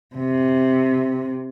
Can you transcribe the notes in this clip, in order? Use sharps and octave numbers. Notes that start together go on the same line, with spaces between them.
C3